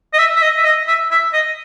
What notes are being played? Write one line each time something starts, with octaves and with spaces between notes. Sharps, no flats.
D#5
E5
E5
D#5
E5
D#5
E5
E5
D#5